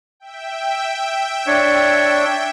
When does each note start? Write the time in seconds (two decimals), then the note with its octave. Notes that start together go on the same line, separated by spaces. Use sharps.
0.20 E5 G5
1.47 D4 C#5